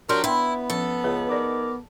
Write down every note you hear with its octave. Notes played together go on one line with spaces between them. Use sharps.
F#3 D4 G4 A#4 C6
B3 D4 E4 G5 C6
F3 C#4 A4
C#2 B4
D#4 G#4 A#4 D5 D6